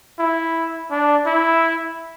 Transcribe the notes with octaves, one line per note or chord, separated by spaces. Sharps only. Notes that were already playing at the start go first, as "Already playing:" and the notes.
E4
D4
E4